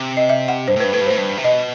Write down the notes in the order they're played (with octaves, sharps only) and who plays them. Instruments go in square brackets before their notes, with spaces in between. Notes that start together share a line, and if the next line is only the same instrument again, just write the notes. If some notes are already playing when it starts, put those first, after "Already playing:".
Already playing: [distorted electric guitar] C3
[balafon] D#5
E5
F#5
[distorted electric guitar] G2 [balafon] C5
[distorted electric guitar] A2
[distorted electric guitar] G2 [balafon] B4
[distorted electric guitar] A2 [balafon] B4
[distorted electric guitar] G2
[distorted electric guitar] A2 [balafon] C5
[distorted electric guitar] G2
C3
[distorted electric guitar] B2 [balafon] D#5